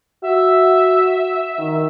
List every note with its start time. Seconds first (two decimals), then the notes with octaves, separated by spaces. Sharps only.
0.24 F#4 E5
1.58 D#3